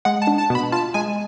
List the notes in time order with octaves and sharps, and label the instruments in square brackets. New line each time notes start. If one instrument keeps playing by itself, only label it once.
[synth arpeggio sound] G#3 [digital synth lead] F#5
[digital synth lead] A5
[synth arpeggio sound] D4
[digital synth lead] A5
[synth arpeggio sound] B2
[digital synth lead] B5
[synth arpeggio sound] F4 [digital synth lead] A5
[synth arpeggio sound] G#3 [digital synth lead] G#5